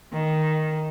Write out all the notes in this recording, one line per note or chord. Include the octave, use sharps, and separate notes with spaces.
D#3